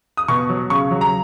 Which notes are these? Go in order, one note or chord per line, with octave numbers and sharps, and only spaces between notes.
D#6
B2 C#6
F#3
C#3 C#6
F#3
A#5